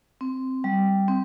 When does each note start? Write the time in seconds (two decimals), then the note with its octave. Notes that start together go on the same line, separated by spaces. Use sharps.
0.21 C4
0.64 G3
1.08 C4